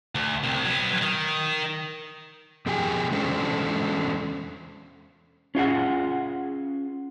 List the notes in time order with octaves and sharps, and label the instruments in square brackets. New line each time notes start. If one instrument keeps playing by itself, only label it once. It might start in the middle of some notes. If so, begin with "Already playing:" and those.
[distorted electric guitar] D2
C2 C3
F#3 B3
D#3
[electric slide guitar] F2 B2 G4 G#4 G5 G#5
E2 G#3 C#4 D4 A4 C5
C#4 F4 G#4 F#5